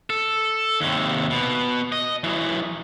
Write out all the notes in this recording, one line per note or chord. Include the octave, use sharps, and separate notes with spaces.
A4
D#2 C3
B2
D#5
E3 F#3